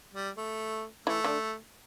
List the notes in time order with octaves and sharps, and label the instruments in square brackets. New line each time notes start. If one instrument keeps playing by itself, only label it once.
[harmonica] G3
A3
[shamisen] E3 E4 [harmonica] A3
[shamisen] D3 D4